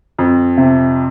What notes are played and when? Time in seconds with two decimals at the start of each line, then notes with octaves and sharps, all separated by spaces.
0.18 F2
0.57 C3